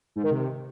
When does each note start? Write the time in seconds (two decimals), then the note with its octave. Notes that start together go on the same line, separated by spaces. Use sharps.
0.16 G#2
0.23 D#3
0.31 C3